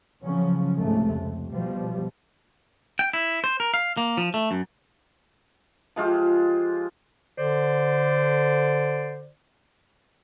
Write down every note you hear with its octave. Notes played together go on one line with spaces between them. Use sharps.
C#3 F3 F#3 C#4
C#2 G#2 C3 A3
F2
B2 F3 G3
G5
E4
C5
A#4
F5
A#3
F3
A3
F#2
F3 G#3 F4 G4
D3 C5 D5